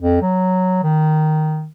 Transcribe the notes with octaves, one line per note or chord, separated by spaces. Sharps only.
F2
F#3
D#3